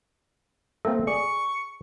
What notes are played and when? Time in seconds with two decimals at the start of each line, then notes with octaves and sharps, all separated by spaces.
0.85 A3 A#3 C4 A4
1.07 G#4 D5 C#6